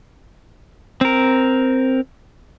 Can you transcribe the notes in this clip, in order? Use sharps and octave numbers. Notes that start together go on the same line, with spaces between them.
C4 A#4